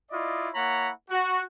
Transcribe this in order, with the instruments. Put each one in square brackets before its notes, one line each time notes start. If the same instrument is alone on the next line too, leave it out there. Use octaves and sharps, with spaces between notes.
[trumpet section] E4 F4 D5 D#5
A#3 E4 C#5 F#5 A#5 B5
F#4